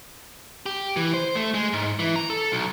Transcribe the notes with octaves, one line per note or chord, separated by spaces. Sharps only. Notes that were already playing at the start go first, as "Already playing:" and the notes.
G4
E3
C5
A3
G#3
G#2
E3
A#5
A4
B1